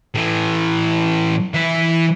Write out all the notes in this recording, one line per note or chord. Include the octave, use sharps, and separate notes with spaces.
A2 E3
E3 E5